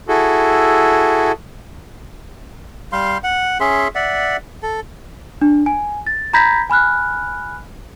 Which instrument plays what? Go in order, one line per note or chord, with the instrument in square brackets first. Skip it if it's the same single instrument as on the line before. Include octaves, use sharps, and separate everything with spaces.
[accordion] E4 F#4 G#4 A4
[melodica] G3 F5 C6
F#5
C#4 G#4 E5 C6
D5 E5 F#5
A4
[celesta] D4
G#5
A6
A#5 B5 G6 G#6 A#6 B6
G#5 B5 F6 F#6